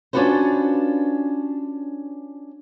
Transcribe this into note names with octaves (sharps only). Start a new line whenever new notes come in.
C#4 D4 F4 F#4 B4 C5